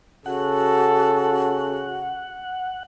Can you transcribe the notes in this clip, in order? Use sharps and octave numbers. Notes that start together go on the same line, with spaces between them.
C#3 F#4 A4 F#5